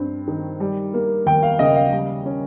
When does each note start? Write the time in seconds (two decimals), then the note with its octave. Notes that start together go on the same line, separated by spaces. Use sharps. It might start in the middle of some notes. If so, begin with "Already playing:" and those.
Already playing: G2 C4
0.28 D#3
0.60 G3
0.94 A#3
1.26 D#2 G5
1.43 F5
1.59 C#3 D#5
1.76 F5
1.92 G3
2.25 C#4